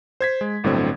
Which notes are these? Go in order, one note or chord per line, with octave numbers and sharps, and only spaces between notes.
C5 G#6 B6
G#3
G1 A2 D3 F#3 C4 G#6